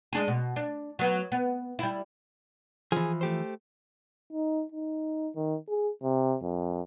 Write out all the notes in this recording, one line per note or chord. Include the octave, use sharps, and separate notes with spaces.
G#3 D4 G#4
B2
D4
F#3 B3
B3
G3 E4
E3 F3 G#4
A3 G4 C5
D#4
D#4
D#3
G#4
C3
F2